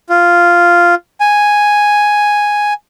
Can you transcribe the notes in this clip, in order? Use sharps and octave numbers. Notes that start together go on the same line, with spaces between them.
F4
G#5